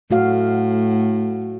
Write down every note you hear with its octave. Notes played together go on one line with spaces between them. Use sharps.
A2 A3 F#4 F5